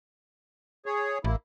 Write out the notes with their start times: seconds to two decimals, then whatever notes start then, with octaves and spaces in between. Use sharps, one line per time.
0.86 G#4 C#5
1.24 A1 A#3 E4